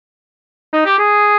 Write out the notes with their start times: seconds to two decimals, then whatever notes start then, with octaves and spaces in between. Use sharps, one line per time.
0.73 D#4
0.85 G4
0.98 G#4